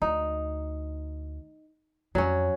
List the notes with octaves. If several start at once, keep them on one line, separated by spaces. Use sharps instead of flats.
D2 D#4
F2 F#3 C#4